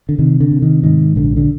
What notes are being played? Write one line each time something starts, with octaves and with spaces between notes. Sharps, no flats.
D3
C3 D#3
D3
C3
D#3
G#2 D#3
A#1 D3
D3